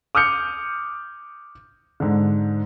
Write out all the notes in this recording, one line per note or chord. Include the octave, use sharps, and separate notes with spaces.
D6 D#6 F6 G6 C#7
G#2 D3